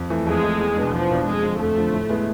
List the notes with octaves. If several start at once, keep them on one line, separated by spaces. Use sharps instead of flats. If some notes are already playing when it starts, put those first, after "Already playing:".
Already playing: F2
E3 A3
F2 G#3
E3 A3
E2
B2 B3 D4
E2 F3
B2 B3 D4
F2 G#3
D3 F3
F2 A3
D3 F3
A2
G#3 B3 E4